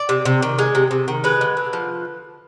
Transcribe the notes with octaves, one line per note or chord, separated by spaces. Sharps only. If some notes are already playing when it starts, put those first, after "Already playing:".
Already playing: D5
C3
C3
D#3
G#3
C3
C3
D#3
G#3 B4
D3
D3
F3